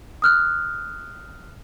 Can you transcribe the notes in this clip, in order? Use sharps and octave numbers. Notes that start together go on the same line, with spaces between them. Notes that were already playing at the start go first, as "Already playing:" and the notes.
D#6 F6 F#6